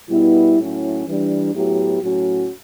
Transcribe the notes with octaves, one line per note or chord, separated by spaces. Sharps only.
B2 G3 B3 E4
A2 F#3 C#4 E4
E3 G3 D4
A2 F#3 B3 E4 G4
A2 F#3 C#4 F#4